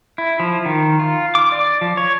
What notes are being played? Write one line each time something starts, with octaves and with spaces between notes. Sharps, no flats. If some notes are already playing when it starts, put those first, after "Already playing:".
E4
F3
D#3
F4
D6
D5
F3
C#5